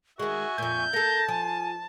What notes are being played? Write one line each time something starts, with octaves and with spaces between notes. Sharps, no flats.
D#3 G#3 F#4 E5 G#5 C#6
F2 A#2 C#6 G6
A#3 A4 A5 A#6
F3 G#5